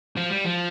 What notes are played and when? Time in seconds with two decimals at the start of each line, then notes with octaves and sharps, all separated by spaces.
0.17 F3
0.31 G3
0.45 F3